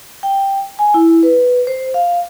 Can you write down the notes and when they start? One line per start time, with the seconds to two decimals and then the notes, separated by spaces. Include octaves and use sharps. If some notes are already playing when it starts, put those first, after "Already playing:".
0.23 G5
0.79 G#5
0.94 E4
1.23 B4
1.67 C5
1.94 F5